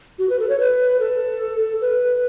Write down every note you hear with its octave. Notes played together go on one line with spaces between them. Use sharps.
F#4
B4
A4
C#5
B4
A4
B4